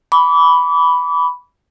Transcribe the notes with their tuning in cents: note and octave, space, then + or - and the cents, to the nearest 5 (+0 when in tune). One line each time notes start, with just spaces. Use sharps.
B5 +0 D6 -30